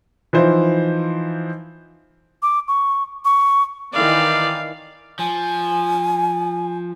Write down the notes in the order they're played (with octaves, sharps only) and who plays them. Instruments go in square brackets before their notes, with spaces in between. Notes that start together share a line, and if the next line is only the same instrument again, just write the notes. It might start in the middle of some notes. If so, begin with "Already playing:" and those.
[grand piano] E3 F3 D#4 C5
[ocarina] D6
C#6
C#6
[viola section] D#3 E3 [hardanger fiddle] D5 [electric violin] F5
[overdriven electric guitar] F3 [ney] G#5